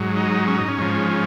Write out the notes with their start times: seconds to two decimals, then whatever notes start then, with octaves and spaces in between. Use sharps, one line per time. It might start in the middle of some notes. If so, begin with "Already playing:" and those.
Already playing: G#2 F#3
0.16 D#4
0.48 C#4
0.58 D#4
0.68 C#4
0.78 G#2 F3